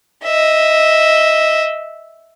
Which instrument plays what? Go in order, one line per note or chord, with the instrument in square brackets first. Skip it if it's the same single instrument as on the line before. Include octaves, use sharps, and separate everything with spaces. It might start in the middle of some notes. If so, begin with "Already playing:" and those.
[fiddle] D#5 E5